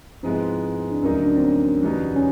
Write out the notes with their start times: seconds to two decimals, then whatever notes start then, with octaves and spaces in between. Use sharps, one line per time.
0.23 G#2 F3 G#3 B3 C4 E4
0.92 D4
1.02 D2 D3 F#3 A#3 C#4 D#4
1.22 D4
1.35 C4
1.42 C#4
1.83 E2 B2 G3 B3 D#4
2.16 C#4